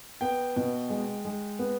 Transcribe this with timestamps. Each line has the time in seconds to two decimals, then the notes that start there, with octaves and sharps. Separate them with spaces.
0.21 B3 G5
0.56 B2
0.90 G#3
1.25 G#3
1.59 B3